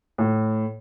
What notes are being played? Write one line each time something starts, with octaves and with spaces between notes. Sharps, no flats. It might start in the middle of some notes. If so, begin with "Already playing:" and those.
A2